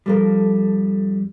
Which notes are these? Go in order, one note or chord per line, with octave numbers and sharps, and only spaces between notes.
F2 G#2 F3 G3 A4 A#4